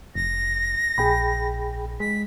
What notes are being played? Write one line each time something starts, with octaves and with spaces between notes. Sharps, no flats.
F1 A#6
A#1 G#4 G5 B5
G#3 B6